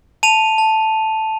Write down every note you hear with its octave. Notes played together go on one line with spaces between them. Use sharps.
A5 D#7 F7
A5